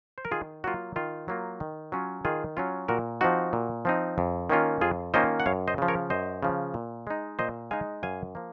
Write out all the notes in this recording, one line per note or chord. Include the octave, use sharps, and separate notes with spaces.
C5
A#4
D#3 F4 G#4
F#3 A#3 F4 F#4
D#3 F4
F#3 A#3 F4
D#3
F#3 C#4 F4
D#3 F4 G#4
F#3 C#4 F4
A#2 F#4 A#4
F3 C4 D#4 F#4
A#2
F3 C4 D#4
F2
D#3 A#3 C#4 F4
F2 F4 G#4
D#3 A#3 C#4 F4 C5 D#5
F#5
F#2 C#5 F5
C5 D#5
C#3 F3
A#4 C#5
F#2 C5 D#5
C#3 F3
A#2
G#3 D#4
A#2 C5 D#5
G#3 D#4 F5 G#5
F#2 F5 G#5
F3 A#3